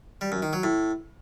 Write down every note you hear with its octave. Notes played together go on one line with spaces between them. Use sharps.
G3
F#2
D#3
F#3
A2